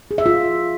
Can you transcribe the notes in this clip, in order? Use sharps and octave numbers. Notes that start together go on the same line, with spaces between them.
G#4
E5
F4